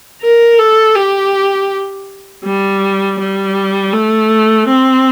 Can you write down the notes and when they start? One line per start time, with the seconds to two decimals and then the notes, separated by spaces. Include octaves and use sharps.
0.22 A#4
0.58 A4
0.95 G4
2.44 G3
3.19 G3
3.93 A3
4.68 C4